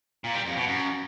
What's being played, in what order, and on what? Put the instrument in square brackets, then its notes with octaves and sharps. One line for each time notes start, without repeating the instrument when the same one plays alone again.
[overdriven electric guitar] A#2
G3
F2
B2
F#2